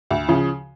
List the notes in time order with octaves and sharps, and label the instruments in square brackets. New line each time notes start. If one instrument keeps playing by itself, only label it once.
[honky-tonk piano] D2
C#3 F3